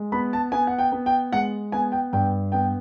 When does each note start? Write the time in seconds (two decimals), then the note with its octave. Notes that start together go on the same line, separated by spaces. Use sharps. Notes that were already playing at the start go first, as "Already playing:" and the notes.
Already playing: G#3
0.12 B3 B5
0.33 A5
0.52 B3 G#5
0.67 F#5
0.79 G5
0.92 B3
1.06 G5
1.33 G#3 F#5
1.72 B3 G#5
1.92 G5
2.13 G2 G5
2.52 B3 G5